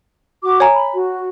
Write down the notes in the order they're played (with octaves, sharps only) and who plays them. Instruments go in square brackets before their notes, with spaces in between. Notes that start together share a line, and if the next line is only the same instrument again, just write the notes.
[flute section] F#4 D6
[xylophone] C#5 G#5 A#5
[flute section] B5
F#4